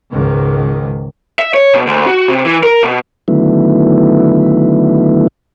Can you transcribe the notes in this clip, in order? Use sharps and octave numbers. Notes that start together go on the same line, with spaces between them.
C#2 G#2 D#3
E5
C#5
B2
D2
F#4
C3
E3
A#4
B2
D3 D#3 F#3 A3 B3 E4